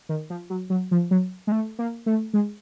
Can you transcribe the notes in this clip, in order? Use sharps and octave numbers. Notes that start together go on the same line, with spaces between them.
D#3
F3
F#3
F#3
F3
F#3
G#3
A3
A#3
A3
G#3